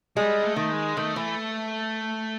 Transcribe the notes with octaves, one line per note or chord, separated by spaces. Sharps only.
G3 G#3
A3
D#3
G#3
D#3 A3
E3